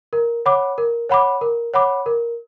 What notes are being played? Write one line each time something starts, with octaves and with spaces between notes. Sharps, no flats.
A#4
C#5 F#5 B5 D6
A#4
C#5 F#5 B5 D6
A#4
C#5 F#5 B5 D6
A#4